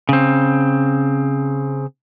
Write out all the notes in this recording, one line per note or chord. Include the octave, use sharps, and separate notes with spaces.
C#3 C4